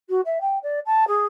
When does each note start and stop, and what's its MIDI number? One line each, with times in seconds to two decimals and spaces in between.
0.09 0.21 66
0.25 0.38 76
0.41 0.58 79
0.63 0.79 74
0.86 1.07 81
1.08 1.25 68